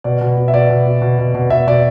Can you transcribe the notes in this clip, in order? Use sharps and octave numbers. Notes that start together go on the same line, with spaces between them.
B2 D5
B2
B2
E5
B2 D5
B2
B2
B2
B2
B2
B2 E5
B2 D5